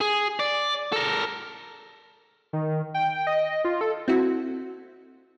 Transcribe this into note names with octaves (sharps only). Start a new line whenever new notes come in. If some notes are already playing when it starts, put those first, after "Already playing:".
G#4
D5
A4 A#4
D#3
G5
D#5
F4
A4
C4 E4 F#4